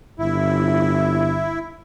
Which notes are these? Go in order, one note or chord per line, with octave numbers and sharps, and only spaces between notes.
G1 E4